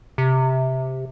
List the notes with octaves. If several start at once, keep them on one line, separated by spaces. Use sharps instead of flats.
C3